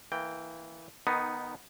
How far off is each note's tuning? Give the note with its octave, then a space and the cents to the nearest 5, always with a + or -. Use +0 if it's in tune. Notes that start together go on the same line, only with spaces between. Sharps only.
E3 -5 A#3 -20 G5 +0
D#3 -20 B3 +0 D#4 +0